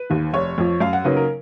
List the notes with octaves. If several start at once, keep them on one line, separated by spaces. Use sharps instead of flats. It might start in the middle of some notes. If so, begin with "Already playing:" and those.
Already playing: B4
D#2 D#3
F1 C#5
F2 F3
F#2 F5
F#5
C#3 F#3 A#3 D#4 B4
A#4